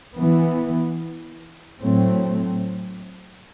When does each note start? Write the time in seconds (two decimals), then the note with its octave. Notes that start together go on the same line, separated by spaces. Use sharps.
0.16 E3 B3
1.80 A2 F#3 A3 C4